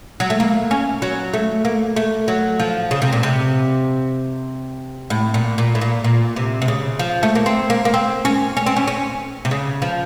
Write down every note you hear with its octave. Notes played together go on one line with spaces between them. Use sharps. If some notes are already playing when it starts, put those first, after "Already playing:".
F#3
A3
A#3
C#4
F#3
A3
A#3
A3
F#3
F3
C#3
C3
A#2
C3
A2
A#2
A#2
A2
A#2
A#2
C3
C3
C#3
F3
A3
A#3
C4
A#3
A#3
C4
C#4
C#4
C4
C#4
C#4
C3
C#3
F3